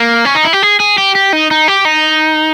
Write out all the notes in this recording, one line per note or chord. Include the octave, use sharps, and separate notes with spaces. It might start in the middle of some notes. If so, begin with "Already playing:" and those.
Already playing: A#3
C#4
D#4
E4
G4
G#4
G#4
G4
G4
D#4
D#4
G4
D#4